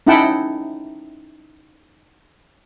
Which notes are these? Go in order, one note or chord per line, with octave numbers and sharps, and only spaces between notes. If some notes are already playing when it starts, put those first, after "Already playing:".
C#4 D#4 E4 F#5 G5 A5